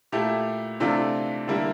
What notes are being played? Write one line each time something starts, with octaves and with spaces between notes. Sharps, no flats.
A#2 A3 E4 G4
C3 E3 A3 D4 F4
D3 G3 A#3 E4